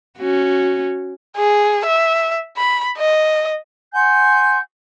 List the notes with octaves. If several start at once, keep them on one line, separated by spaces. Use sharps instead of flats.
C#4 F#4
G#4
E5
B5
D#5
F#5 G#5 C6 G6